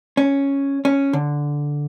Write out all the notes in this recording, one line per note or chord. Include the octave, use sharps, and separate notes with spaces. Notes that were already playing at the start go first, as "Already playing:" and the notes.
C#4
C#4
D3